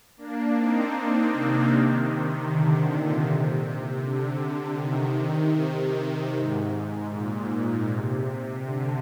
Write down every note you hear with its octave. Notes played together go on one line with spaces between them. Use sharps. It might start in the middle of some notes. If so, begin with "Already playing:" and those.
A#3 D4
C4 D#4
A#3 D4
C3 D#3
D3
A#2
C3
D3
C3 D#3
C3
G#2
G#2
A#2
C3
C3
D3